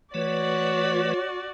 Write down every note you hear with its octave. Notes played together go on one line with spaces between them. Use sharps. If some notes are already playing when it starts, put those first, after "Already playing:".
E3 A3 F#4 B4 C#5 D5